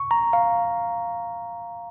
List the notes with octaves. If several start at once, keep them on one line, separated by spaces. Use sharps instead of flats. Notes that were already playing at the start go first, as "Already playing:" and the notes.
Already playing: C#6
A#5
F5